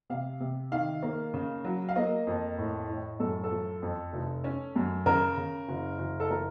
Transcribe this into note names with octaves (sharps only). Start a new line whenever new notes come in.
C3 F5
C3
D#3 F5
A#3
C#3
F#3
F5
A#3 D#5
F2
A2
A2
F#2 A4
A4
F3
F2
F1
C#4
F#2
C#3 A#4
C#3
F#1
F#1
A4
F3 A#4